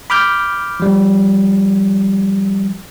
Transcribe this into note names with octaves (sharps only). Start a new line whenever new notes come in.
B5 D6 F6 G6
F3 G3